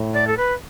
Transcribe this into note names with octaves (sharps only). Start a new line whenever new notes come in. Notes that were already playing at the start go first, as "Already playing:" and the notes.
Already playing: A2
D5
A4
B4